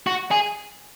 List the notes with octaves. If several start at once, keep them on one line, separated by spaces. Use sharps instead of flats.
F#4
G#4